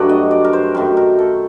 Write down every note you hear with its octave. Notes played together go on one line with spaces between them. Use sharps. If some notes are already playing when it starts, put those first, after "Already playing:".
Already playing: G2 F#3 A3 D4
D#5
D5
A#4
C5
F#2 D#3 A3 A#4
A#4
A4